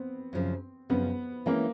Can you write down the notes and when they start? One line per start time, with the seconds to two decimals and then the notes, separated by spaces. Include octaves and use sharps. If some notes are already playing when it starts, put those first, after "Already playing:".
Already playing: B3 C4
0.33 F#2 C#3 F3
0.90 F#2 C#3 F3 B3
1.46 E3 G#3 A#3 C#4